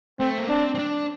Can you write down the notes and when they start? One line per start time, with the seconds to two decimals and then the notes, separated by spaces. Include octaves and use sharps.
0.20 A3 C4
0.38 A#3
0.49 C4 D4
0.75 C4
0.79 D4